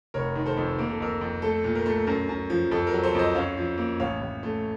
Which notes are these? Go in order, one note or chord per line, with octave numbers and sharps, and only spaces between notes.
F1 A#4 C#5
D#3
A4 C5
F2
A#3 A#4
A4
F2 A#4
F2
A3 A4
A#2
A#4
A3
F#2 A#4
F#2
F3
F2 A4
A#4
F#3
A4 C5
F2 C5 D#5
F#2 C#5 F5
F3
A#3
A1 C#5 F5
A1
A3